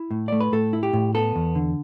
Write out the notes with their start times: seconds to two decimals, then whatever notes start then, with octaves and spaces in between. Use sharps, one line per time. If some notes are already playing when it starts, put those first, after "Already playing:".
Already playing: E4
0.11 A2
0.28 A3 D5
0.41 B4
0.52 A2 A4
0.73 E4
0.83 G4
0.93 A2
1.15 B3 A4
1.36 E2
1.55 D3